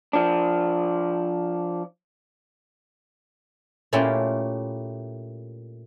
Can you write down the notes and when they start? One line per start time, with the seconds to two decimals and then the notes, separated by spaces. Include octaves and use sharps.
0.13 F3 D4
3.93 A#2 A3 C#4 E4 F4 G4